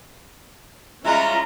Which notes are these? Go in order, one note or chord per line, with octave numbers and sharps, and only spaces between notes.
G3 G#3 C#4 E4 F4 A#5